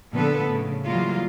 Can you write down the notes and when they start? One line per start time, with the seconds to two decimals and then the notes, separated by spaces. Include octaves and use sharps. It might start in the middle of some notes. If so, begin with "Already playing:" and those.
0.13 A#2 D3 F3 B3 A4 B4
0.47 A2 C#3
0.87 C#3 E3 F#3 G3 A#3 F4